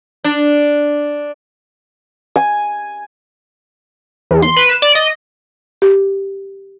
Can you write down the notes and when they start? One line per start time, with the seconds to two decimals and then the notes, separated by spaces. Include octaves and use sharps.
0.24 D4
2.36 G#5
4.31 E2
4.43 C6
4.56 B4
4.69 E7
4.82 D5
4.95 D#5
5.82 G4